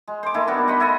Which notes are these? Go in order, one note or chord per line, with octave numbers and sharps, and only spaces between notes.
G#3
C5 D6
D#3 A3 A#3 E4
G3 B3 D4 F#4
C5 D#5 F#5 B5
E4 A4 D#5